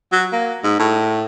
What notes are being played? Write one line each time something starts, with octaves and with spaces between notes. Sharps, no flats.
F#3
A#3
G#2
A2